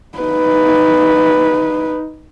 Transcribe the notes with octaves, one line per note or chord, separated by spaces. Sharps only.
D#4 B4